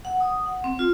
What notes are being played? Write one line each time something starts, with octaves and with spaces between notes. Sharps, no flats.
F#5
D#6
F#5
C4
F4